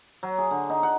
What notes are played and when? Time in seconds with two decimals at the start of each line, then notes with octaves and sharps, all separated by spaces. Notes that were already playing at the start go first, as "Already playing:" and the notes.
0.23 F#3
0.38 G#4
0.51 D3
0.70 D#4
0.83 F#5